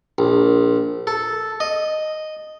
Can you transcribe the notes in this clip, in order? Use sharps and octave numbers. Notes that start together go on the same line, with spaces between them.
A#1
A4
D#5